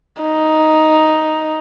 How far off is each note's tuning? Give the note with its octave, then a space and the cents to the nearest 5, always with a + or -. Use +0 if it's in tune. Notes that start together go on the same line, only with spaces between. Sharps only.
D#4 +5